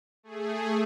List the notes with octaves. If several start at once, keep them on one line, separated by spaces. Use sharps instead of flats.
A3 G#4